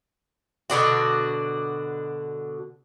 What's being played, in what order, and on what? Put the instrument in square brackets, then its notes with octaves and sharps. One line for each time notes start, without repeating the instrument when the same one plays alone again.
[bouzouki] B2 D3 D4 F#4